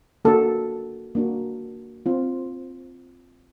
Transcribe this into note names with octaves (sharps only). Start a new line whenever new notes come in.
A#3 D4 F#4 A4
A#3 D4 F#4
C4 F4